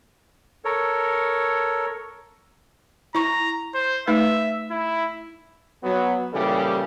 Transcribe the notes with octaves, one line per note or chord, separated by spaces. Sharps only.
A4 A#4 C#5
E4 A#5 C#6
C5
A3 D#4 B4 E5
E4
F#3 B3
A#2 C#3 E3 G3 G4 A4